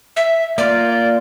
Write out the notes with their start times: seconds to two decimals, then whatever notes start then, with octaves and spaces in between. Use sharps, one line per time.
0.16 E5
0.58 A#3 F4 D5